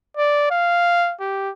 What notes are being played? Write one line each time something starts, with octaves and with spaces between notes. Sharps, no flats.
D5
F5
G4